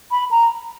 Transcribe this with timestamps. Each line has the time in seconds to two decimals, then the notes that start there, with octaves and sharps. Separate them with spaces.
0.11 B5
0.31 A#5